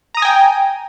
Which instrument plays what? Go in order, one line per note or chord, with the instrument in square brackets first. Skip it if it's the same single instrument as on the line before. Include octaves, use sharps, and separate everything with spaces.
[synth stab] A#5
D#6
A#6
G#5
G5